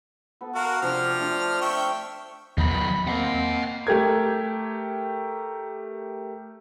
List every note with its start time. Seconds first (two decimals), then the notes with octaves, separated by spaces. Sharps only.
0.41 B3 A4
0.55 F#4 A#4 F5
0.82 C3 F3 C4 D4 F6
1.19 A3 D4
1.61 E5 G5 C#6
2.58 E2 D#3 F#3 B5
3.08 A#3 C4 D#5 F#5
3.87 A3 G4 A#4 G#6